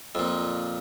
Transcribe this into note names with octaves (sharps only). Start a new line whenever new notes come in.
F2 A#2